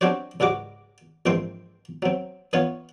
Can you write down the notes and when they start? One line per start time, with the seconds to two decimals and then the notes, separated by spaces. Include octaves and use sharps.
0.01 C4 D4 F#4 G4 C5 C#5
0.40 C#2 G#2 G3 F#4 D6
1.26 A#1 G#2 E3 C4 G5 C6
2.02 F#3 C4
2.53 E3 B3 C#4 F4 C#5